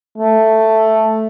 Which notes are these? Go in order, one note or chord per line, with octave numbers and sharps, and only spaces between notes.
A3